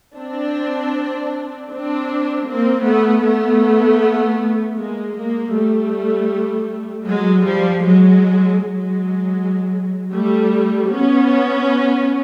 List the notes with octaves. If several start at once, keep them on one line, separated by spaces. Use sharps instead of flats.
C4 D4
C4 D4
A#3 C4
A3 B3
A3 B3
G#3 A#3
G#3 A#3
G3 A3
F#3 G#3
F3 G3
F#3 G#3
F#3 G#3
G3 A3
B3 C#4